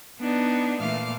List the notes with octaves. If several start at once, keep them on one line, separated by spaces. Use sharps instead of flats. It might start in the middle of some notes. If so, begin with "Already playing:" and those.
B3 D4 D#4
A#2 E3 A3 F5 D6 F6